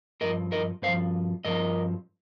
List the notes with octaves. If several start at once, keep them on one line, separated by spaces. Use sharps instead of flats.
G2 F3 A#4 D#5
A#4 D#5
G2 C5 F5
F3
G2 F3 A#4 D#5